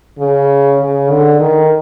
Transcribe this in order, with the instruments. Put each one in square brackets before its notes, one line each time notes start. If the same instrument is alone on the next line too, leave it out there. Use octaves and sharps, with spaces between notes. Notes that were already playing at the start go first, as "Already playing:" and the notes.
[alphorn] C#3
C#3
D3
D#3